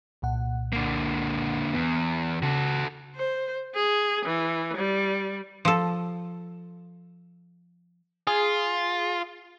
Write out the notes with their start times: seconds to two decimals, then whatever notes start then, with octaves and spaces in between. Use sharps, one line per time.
0.22 C2 A#2 F#5
0.73 D3 A#3
1.74 E2 B3
2.43 C#3 F#4 A4
3.16 C5
3.75 G#4
4.25 E3
4.77 G3
5.65 F3 A4
8.27 F4 G#4